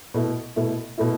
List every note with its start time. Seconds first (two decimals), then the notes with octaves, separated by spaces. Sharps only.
0.14 B2 A3 E4
0.56 B2 A3 E4
0.98 B2 A3 E4